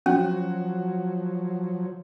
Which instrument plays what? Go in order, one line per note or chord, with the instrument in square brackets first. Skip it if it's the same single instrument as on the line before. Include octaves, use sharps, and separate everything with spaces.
[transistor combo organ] F3 F#3 [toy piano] C#4 [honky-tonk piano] F#4